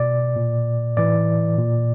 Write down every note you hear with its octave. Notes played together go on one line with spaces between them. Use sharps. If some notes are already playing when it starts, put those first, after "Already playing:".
Already playing: B2 D5
A#2
A2 E3 D5
A#2